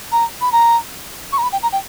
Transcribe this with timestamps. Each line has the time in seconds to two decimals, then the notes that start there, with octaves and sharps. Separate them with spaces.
0.12 A#5
0.41 B5
0.52 A#5
1.32 C#6
1.38 A#5
1.43 B5
1.52 G5
1.63 A#5
1.72 G5